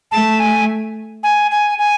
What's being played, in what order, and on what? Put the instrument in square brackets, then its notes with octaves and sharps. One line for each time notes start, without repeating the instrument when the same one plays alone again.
[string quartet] A3 [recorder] A5
[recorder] G#5
G#5
G#5
G#5